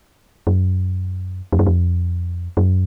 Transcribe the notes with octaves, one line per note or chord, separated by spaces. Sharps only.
F#2
F2
F#2
F2
F#2